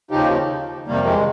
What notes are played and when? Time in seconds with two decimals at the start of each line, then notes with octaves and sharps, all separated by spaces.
0.11 D#2 C#3 F3 D#4 G4
0.87 F2 C3 D#3 G3 A#3
1.07 G#3